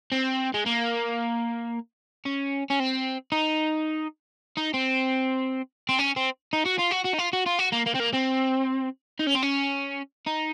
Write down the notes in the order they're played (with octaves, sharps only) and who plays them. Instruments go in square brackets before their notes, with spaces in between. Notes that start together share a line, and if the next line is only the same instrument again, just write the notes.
[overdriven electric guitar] C4
G#3
A#3
C#4
C#4
C4
D#4
D#4
C4
C4
C#4
C4
D#4
F#4
F4
F#4
F#4
D#4
F4
F#4
F4
F#4
A#3
A#3
C4
A#3
C4
D#4
C#4
C4
C#4
D#4